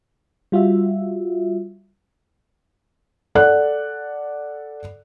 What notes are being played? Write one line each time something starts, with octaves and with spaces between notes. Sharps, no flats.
G3 F4 F#4 E5
A4 D5 F#5 F#6